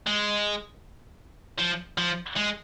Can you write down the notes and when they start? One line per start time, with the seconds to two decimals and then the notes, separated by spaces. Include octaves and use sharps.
0.07 G#3
1.59 F3
1.98 F3
2.36 G#3